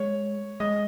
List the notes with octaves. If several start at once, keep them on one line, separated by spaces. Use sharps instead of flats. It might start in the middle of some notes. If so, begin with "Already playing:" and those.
Already playing: G#3 C#5
G#3 D#5